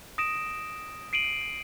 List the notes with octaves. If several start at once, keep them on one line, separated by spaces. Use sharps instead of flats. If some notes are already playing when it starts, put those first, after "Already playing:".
D#6 A#6 D7 E7
C7 D7 D#7 F#7